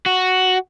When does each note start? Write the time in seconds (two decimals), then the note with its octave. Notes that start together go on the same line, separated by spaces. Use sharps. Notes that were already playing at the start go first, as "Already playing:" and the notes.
0.06 F#4